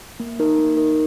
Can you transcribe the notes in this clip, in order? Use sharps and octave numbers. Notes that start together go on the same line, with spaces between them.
A#3
D#4 A#4
A#3
D#4 A#4